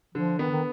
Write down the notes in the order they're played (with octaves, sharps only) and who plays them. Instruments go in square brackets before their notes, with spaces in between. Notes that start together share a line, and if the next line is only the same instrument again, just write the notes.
[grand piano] D3 [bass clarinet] F3
[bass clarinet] D#3 [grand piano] B3
[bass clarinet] D#3